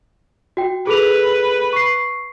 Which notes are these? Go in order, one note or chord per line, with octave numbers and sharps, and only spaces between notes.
F#4 G5
G#4 A4 B4 F7
C#6 C7